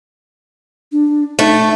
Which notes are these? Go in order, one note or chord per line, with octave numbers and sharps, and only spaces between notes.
D4
A3 D#4